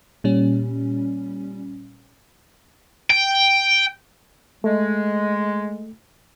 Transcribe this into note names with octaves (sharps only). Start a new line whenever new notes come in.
A#2 G3 C#4
G5
G#3 A3